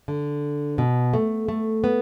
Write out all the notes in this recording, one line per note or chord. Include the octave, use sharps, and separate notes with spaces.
D3
B2
A3
A3
B3